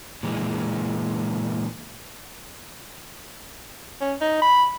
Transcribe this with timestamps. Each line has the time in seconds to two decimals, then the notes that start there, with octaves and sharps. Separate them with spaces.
0.23 A#2 E3 G#3
4.01 C#4
4.21 D#4
4.42 B5